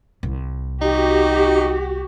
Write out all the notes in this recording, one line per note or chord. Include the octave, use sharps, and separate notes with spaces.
C2
D#4 F#4 G4